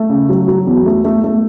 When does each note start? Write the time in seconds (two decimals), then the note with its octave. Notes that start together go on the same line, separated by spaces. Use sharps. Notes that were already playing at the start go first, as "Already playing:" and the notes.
Already playing: A3
0.09 C#3
0.29 F#3
0.48 F#3
0.67 E2
0.86 A3
1.04 A3
1.24 A3